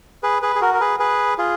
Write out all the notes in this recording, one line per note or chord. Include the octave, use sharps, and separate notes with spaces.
G#4 B4
G#4 B4
G#4
F#4 A#4
A#4
G#4 B4
G#4 B4
F4 G#4